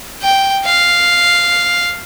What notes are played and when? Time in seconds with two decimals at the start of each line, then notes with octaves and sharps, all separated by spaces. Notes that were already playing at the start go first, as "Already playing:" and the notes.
0.22 G5
0.65 F5